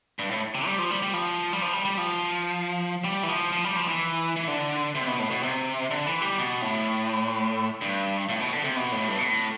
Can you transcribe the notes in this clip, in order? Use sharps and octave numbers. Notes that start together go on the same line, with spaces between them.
G2
A2
C3
G3
F3
G3
G3
F3
G3
F3
G3
G3
F3
G3
E3
F3
F3
G3
F3
E3
E3
D3
C3
B2
A2
B2
C3
D3
E3
G3
B2
A2
G2
A2
B2
D3
C3
B2
A2
G2
B2
A2